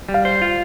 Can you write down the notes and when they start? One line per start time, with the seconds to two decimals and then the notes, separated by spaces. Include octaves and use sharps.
0.09 G3
0.14 F5
0.25 C5
0.42 F4